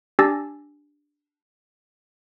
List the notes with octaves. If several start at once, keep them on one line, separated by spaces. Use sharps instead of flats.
D4 G4 G#5 E6 A6 A#6